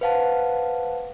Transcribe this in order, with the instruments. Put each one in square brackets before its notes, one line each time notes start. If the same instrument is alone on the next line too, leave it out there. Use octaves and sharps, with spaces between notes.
[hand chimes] B4 C5 F5 F#5 A5